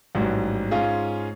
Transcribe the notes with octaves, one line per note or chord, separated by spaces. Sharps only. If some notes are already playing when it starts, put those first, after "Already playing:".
A1 G#2 F#3 G3
G#2 C#4 F4 G#4